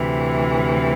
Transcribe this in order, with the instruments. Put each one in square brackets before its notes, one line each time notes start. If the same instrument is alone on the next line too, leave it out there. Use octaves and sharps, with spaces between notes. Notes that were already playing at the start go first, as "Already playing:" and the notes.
Already playing: [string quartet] D2 C3 E3